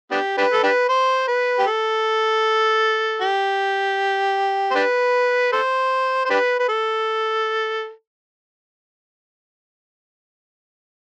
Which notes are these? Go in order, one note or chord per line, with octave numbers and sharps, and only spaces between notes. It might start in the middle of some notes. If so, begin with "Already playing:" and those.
B3 D4 G4
D4 G4 B4
A4
D4 G4 B4
C5
B4
G4
A4
G4
C5
D4 G4 B4
A4 C5
C5
D4 G4 B4
B4
A4